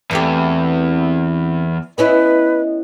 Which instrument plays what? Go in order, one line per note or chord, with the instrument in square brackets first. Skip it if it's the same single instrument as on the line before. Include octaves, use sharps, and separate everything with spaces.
[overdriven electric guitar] E2 [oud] E3 A3 G4 [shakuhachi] C4
[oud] B3 C#4 E4 [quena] B4 [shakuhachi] D#5